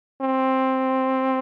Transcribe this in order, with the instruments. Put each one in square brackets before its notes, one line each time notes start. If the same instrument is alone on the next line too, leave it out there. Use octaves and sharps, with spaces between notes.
[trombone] C4